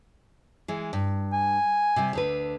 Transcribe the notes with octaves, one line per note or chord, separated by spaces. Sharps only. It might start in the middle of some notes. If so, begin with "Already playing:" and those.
E3 G#3
G2
G#5
C3 G3
D2 D3 B4